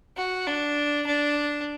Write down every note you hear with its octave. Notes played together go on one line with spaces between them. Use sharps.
F#4
D4
D4